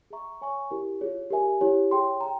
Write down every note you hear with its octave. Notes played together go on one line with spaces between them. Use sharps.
G#4 E5 A#5 C#6
C#5 E5 G#5 C#6
E4 G4 A#4
F4 G#4 C#5
G4 A#4 E5 G#5
E4 G4 C#5
G#4 C#5 G5 C6
G5 A#5